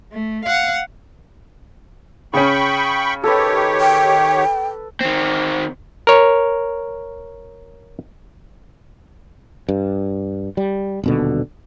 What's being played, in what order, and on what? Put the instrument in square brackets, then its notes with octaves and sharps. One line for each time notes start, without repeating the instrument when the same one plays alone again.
[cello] A3
F5 F#5
[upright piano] C#3 C#4 [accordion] G5 B5 C#6
[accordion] D#3 G4 C#5 [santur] A4 B4
[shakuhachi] G5
[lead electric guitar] D#3 C4
[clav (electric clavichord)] A#4 C#5
[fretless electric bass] G2
G3
D#1 B2 D3